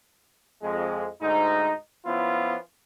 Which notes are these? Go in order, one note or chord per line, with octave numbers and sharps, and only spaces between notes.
F2 G#3
D2 G#2 D#4
F3 B3 C#4 E4 F4